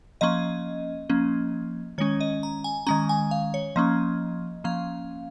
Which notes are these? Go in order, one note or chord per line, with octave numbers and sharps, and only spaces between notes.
F3 A#3 C#4 D#5
F3 A#3 C#4
D#3 G#3 C#4 C#5
D#5
A#5
G#5
D#3 G#3 C#4 A#5
G#5
F5
C#5
F3 A#3 C#4 D#5
F3 A#3 C#4 F5